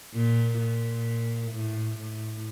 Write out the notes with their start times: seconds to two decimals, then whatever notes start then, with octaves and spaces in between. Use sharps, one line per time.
0.14 A#2
0.59 A#2
1.52 A2
1.99 A2